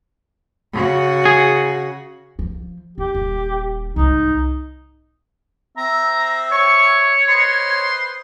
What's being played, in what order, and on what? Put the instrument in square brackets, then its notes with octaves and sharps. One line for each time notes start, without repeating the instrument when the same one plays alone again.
[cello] C#3 F#4
[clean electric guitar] G#4
[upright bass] F3
[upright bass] D#4 [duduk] G4
[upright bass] D#1
[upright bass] C2 G#2 [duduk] D#4
[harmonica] C4 E5 [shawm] A#5
[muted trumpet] C#5 [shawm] C#6
[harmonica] B4 C5 D#5 [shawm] C6